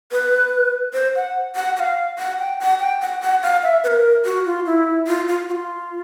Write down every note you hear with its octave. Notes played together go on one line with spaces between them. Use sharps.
B4
C5
F#5
F#5
F#5
F5
F#5
G5
F#5
G5
F#5
F#5
F5
E5
B4
A#4
F#4
F4
E4
F4
F4
F#4
F4